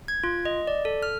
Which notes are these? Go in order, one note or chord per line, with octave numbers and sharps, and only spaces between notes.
G#6
F4
D#5
D5
A4
F6